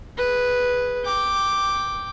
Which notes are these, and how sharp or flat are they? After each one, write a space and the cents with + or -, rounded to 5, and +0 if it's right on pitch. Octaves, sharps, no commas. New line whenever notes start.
G#4 +0 B4 +0
G5 +0 D6 +0